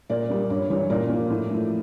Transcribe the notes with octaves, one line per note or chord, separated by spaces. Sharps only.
A#2 A#4 D5
G3 A#3
G2 C#5
E3 G3 C#5
A#2 A#4 D5
F3 A#3
A2
F3 A3